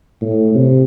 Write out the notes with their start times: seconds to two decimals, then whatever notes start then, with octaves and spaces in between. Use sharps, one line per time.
0.21 A2
0.55 C3